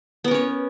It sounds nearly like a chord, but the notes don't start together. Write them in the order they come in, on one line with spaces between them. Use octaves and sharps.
B3 A#4 C#4 C#5